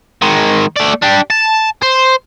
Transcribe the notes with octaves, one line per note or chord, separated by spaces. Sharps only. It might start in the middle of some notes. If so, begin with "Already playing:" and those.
D#3 G#3
A3 D5
D4 G4
A5
C5